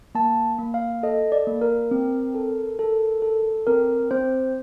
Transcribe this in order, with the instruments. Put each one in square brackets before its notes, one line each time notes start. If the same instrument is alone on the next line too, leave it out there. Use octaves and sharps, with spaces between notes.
[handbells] A#3 A5
A#3
F5
A4 D#5
D5
A#3
A#4
C4
A4
A4
A4
C4 A#4
C4 C5